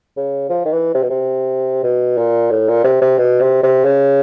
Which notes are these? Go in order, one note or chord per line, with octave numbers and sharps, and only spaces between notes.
C#3
F3
D#3
E3
C3
B2
C3
B2
A#2
A2
A#2
C3
C3
B2
C3
C3
C#3